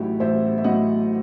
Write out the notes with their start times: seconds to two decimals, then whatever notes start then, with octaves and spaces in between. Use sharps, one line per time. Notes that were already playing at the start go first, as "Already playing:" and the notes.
Already playing: A1 A2 F#3 D#4 E4 F#4 G4
0.20 A1 C5 E5
0.58 E5
0.64 A2 F#3 D#5 F#5